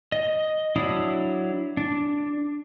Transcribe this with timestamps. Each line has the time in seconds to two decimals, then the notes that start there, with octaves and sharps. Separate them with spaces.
0.12 D#5
0.76 F#3 D4 E4 D#6
1.77 D4